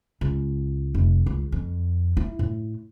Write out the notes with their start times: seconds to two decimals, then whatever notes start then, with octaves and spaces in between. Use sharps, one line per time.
0.21 C#2
0.95 F1
1.26 C#2
1.52 F2
2.17 E4
2.39 A2